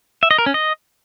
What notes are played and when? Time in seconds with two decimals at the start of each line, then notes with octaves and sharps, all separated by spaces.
0.23 E5
0.31 D#5
0.38 A#4
0.46 C#4
0.54 D#5